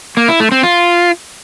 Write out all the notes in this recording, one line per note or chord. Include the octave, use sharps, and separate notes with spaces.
A#3
E4
A3
C4
F4